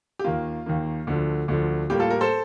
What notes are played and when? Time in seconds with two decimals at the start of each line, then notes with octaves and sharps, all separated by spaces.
0.19 G4
0.24 D#2 D#3 A#3 F4
0.66 D#2 D#3 A#3
1.07 D2 D3 F3
1.48 D2 D3 F3
1.90 A2 G3 A#3 G4
2.00 F4 A4
2.10 G4 A#4
2.21 A4 C5